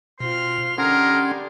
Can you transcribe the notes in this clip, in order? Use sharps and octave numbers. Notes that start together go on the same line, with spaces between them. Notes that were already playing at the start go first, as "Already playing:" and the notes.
B2 C4 F4 C6 F6
D3 G3 C#4 D#4 G#4 A#4 F#5 C6